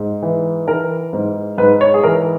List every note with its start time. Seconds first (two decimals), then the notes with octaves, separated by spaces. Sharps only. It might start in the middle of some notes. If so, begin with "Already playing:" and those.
Already playing: G#2
0.22 E3
0.67 E3 A#4
1.13 G#2
1.58 G#2 B4
1.81 C#5
1.94 G#4
2.03 E3 A#4